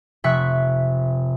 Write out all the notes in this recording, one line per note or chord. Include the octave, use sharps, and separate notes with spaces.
F1 C3 E5 C#6 F#6 B6